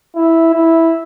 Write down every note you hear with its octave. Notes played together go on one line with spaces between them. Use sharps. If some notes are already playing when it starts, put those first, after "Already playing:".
E4
E4